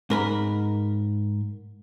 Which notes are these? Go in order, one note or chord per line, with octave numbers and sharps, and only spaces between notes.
G#2 A#4 B5